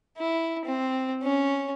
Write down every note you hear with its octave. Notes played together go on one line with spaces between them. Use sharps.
E4
C4
C#4